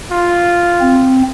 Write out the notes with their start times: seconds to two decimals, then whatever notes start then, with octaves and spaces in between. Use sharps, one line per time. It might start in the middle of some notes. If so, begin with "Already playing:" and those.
0.12 F4
0.81 C4